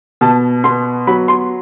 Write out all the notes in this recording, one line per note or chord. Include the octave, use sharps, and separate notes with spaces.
B2 A5
B3 C6
F#3 B5
C6